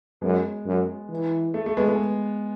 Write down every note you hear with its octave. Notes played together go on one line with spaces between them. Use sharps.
F#2 G#3 B3
F#2
E3
A3
A3
G#3 B3
G#3 B3